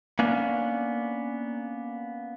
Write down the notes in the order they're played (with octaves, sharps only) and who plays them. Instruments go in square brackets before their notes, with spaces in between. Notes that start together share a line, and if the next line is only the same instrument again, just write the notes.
[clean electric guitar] A#3 B3 C#4 D4